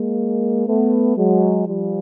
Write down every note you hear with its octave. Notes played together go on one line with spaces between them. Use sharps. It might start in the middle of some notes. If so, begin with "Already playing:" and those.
Already playing: G#3 A#3
A3 B3
F#3 G#3
F3 G3